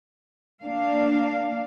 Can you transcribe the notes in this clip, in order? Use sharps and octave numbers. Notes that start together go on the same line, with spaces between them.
A#3 D4 F5